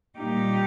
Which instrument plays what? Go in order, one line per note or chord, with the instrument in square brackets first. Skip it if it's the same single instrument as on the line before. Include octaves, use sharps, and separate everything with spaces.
[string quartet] A#2 G3 A#3 D#4 G4